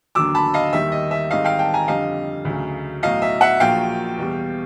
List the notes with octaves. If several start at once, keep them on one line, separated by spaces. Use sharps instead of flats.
D#2 D3 F#3 D6 E6
A5 B5
D#5 F5
D#2 D#3 G3 E5
D#5
E5
G#1 G#2 D#3 G3 D#5 F5
F5 G5
G5 A5
G#5 A#5
F2 D3 G3 D#5 F5
D2 C#3 F#3
B1 A2 F#3 D#5 F5
E5
E5 F#5
A#1 A#2 F#3 F5 G5
E2 B2 G3